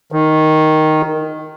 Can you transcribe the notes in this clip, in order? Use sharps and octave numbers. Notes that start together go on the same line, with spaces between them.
D#3